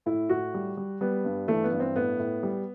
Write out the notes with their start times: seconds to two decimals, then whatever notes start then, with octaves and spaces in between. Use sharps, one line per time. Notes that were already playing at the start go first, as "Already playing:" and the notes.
0.06 A2 E4
0.29 A2 F#4
0.54 G3
0.77 G3
1.01 G3 B3
1.25 G2
1.48 E3 A3
1.64 B3
1.72 G2
1.80 C4
1.96 A2 B3
2.19 A2
2.43 G3